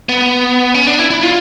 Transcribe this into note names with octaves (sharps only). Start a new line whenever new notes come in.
B3
C#4
D4
E4
E4
F4